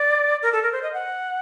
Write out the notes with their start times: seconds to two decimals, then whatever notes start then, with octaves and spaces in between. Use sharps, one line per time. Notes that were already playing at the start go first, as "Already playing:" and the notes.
Already playing: D5
0.43 A#4
0.53 A4
0.63 A#4
0.72 C5
0.83 D#5
0.93 F#5